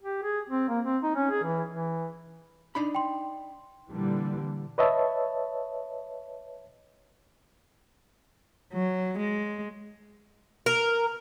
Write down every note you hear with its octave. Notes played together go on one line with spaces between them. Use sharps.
G4
G#4
C4
A#3
C4
D#4
C#4
G#4
E3
E3
D4 D#4 B5
G5 C6
A#2 D3 E3 G3
B4 C#5 D#5 E5 A5
F#3
G#3
A#4